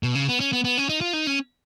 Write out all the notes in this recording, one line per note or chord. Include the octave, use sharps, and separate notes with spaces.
B2
C#3
B3
C#4
B3
B3
C#4
D#4
F4
D#4
C#4